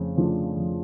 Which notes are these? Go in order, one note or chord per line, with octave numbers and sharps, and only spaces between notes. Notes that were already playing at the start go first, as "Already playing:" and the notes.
Already playing: F2 C#3 A3
C#3 F3 A3 D4
F2